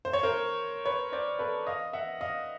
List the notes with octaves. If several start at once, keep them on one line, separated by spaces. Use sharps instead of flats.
C5
C#5
A#4 C5
B4 C#5
C5 D5
A4 B4
D#5 F5
E5 F#5
D#5 F5